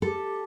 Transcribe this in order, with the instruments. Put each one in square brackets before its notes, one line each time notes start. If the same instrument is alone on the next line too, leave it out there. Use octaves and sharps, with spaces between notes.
[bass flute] G4 [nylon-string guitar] A4